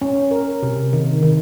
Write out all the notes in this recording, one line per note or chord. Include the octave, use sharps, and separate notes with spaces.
C#4
A#4
C3
D#3
D#3